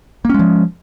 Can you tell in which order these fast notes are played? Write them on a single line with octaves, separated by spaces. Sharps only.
A#3 C#4 G#3 F3